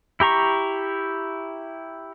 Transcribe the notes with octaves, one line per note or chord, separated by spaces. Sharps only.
E4 G4 A#5 C#6